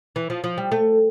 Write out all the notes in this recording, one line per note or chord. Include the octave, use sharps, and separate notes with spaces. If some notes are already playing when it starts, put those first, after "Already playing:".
E3
F3
F3
G3
A3